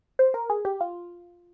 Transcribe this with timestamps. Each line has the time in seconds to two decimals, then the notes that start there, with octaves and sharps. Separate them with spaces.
0.19 C5
0.34 A#4
0.50 G#4
0.65 G4
0.81 F4